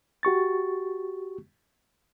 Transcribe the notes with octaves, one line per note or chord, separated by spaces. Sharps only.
F#4 G4 C#6 A6